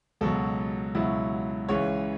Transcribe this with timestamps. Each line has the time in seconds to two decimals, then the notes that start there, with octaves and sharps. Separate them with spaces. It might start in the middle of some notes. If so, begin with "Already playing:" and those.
0.21 C#2 B2 F#3 A4
0.95 C#2 B2 F#3 E4
1.69 C#2 C#3 E3 C#5